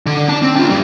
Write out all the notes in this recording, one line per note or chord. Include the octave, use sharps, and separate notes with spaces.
D3
D4 A5
C4
D4 F4
G2 G3